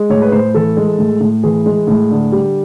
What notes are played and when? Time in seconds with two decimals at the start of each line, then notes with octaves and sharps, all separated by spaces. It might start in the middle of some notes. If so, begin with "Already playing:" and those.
Already playing: G#3
0.10 A2 C#5
0.22 B4
0.32 A2 C5
0.54 E3 A4
0.77 G#3
0.99 A2
1.21 A2
1.43 E3 G#4
1.66 G#3
1.87 A2
2.11 D3
2.32 G3